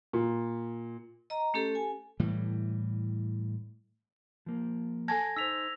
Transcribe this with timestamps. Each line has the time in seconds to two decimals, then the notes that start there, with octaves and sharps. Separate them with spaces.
0.13 A#2
1.30 D#5 A#5
1.54 A3 C#4 G4 A4
1.75 G#5
2.20 A2 E3 G3
4.46 F3 A#3
5.08 A4 G#5 A5 G#6 A#6
5.36 D#4 C5 E6 B6 F7